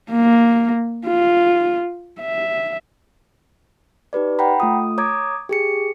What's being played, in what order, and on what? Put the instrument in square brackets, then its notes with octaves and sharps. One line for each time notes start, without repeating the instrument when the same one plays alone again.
[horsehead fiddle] A#3
F4
E5
[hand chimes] D#4 G4 B4 D5
F#5 G5 A#5 B5
A3 F4 D#6
C#5 A#5 D6 D#6 G#6
G4 G#4 C#7